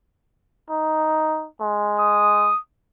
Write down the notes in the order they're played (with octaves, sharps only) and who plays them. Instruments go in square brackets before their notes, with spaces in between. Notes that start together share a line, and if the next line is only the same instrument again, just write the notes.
[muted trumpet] D#4
G#3
[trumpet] D#6